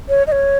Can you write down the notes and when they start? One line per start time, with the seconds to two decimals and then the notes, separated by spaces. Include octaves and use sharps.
0.09 C#5
0.27 D#5
0.32 C#5